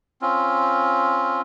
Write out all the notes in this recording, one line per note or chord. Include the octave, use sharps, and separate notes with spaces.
C4 C#4 F4